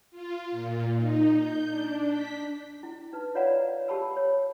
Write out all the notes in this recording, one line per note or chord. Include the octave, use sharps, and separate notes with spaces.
F4
A#2
D#4
G6
D4
B6
E4
D#4 B4
F4 C#5 D5 F5 F#5 A#5
G4 A4 A5 B5 E6
C#5